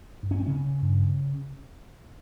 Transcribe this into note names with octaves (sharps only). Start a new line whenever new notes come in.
G2
C#4
C4
C#3 C#4
G2